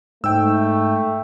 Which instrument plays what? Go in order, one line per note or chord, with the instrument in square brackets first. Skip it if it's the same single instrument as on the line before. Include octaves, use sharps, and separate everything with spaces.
[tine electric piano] G#2 [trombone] A3 [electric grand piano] G5 E6